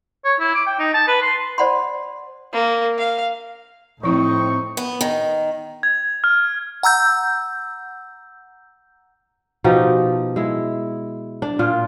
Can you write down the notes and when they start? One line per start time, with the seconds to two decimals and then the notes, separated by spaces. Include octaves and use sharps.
0.25 C#5
0.40 E4
0.54 D6
0.66 G5
0.79 D#4
0.94 A5
1.07 B4
1.22 C6
1.58 C5 D5 F#5 B5 C6
2.53 A#3
2.98 F5
4.03 A2 F3 C4 D#4 E4 C#6
4.77 B3
5.01 D#3
5.83 G#6
6.24 F6
6.83 F#5 A#5 E6 G6
9.64 B2 F3 D#4 G4
10.36 G#3 E4
11.42 D4
11.59 A#2 F4